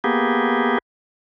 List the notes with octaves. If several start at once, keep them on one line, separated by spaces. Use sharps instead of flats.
A#3 B3 G4 G#4